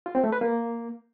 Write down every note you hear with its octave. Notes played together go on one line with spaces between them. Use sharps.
F4
C4
A3
B4
A#3